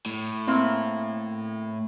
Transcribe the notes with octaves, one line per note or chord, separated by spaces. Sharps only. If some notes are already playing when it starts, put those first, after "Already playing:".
A2
A#3 C4 E4